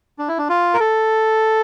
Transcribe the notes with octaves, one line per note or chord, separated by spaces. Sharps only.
D4
E4
D4
F4
A#4
A4